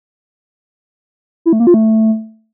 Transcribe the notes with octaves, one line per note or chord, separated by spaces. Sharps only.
E4
A3
A#3
F4
A3